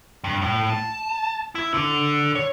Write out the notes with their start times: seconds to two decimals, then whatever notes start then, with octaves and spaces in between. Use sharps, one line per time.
0.24 G2
0.42 A2
0.70 A5
1.55 E4
1.74 D3
2.35 C#5